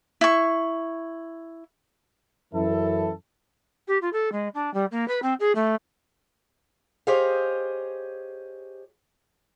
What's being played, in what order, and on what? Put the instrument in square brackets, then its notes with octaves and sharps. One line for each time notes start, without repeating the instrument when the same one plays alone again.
[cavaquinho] E4 C#6
[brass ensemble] F#2 E3 A4 [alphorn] E4
[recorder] G4
F4
A4
G#3
D4
G3
A#3
B4
C4
G#4
A3
[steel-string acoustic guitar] G4 G#4 C5 C#5 D#5 F5